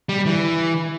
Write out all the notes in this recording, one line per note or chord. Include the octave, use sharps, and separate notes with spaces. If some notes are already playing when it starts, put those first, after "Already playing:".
G3
E3